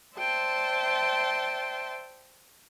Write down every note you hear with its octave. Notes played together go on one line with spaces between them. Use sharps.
C5 D5 E5 G5 A5 C6